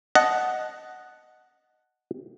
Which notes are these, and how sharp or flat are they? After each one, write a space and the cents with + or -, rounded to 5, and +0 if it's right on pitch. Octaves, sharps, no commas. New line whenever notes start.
D#5 +0 F#5 +0 A5 -15